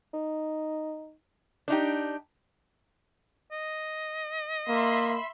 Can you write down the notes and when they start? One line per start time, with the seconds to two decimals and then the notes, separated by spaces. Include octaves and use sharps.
0.14 D#4
1.68 D4 D#4 G4
3.52 D#5
4.68 A#3 E5 B5 C6